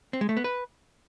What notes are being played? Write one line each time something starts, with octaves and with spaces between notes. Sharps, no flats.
C4
G#3
A3
B3
B4